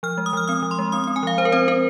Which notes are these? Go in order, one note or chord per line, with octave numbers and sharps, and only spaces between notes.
F3 F6
G#3
D#6
F3 F6
C4 D#6
F3
C6
G#3
C4 D#6
C4 D#6
G#5
F3 F5
F3 C5
A#4
C4 C5
C4 A#4